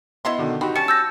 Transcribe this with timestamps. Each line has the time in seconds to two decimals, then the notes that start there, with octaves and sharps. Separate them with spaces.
0.25 B3 E4 D#5 C6
0.38 B2 D3 D#3
0.61 C4 D#4 F#4 G4 B5
0.76 G3 C#4 G4 A5 C#7
0.88 E6 G6 A#6